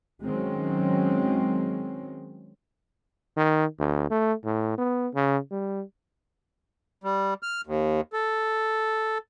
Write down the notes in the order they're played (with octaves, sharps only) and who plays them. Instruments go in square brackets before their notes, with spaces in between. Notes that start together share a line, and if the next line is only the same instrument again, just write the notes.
[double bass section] D#3 F#3 G#3 C4 C#4
[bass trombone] D#3
D2
A3
A2
B3
C#3
G3
[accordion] G3
F6
D#2
A4